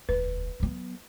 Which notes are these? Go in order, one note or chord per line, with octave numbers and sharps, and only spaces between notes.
E1 D2 B4
F#3 B3